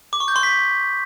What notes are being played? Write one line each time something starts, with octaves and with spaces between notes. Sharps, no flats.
D6
C#6
G6
C6
B6